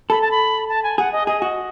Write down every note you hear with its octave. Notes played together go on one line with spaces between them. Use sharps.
A4 B5
A5
B5
A5
G#5
G#4 F#5
D#5
G#4 D#5
F#4